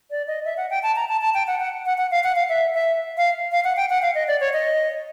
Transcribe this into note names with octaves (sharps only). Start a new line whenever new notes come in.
D5
D#5
E5
F#5
G5
A5
A#5
A5
A5
G5
F#5
F#5
F#5
F#5
F5
F#5
F5
E5
E5
F5
F5
F#5
G5
F#5
F5
D#5
D5
C#5
D#5